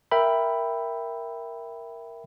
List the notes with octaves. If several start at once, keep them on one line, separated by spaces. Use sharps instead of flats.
A#4 E5 G5 B5